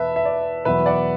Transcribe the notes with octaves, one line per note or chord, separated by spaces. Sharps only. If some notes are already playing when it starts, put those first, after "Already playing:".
Already playing: E2 B2 B4 E5 A5
E5
D5
E2 B2 F#3 B4 E5
D5 F#5